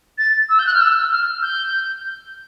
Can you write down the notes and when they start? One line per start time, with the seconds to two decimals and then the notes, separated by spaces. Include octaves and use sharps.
0.18 A6
0.49 E6
0.59 G6
0.66 F#6
0.74 F6
0.80 E6
1.11 F6
1.42 G6